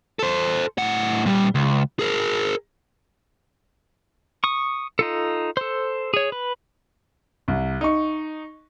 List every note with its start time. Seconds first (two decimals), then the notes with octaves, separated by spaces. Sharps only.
0.19 A4 C5
0.78 A2 F#5
1.26 A#2 G3
1.55 C#2
1.99 G#4 A#4
4.44 C#6 D#6
4.99 D#4 F4 A4
5.57 A4 C5
6.14 G#4 C#5
6.32 B4
7.48 C2
7.81 D#4 C#6